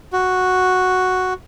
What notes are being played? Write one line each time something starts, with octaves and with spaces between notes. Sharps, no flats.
F#4